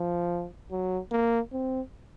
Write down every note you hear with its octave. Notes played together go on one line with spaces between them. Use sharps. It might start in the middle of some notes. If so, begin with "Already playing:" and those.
Already playing: F3
F#3
A#3
C4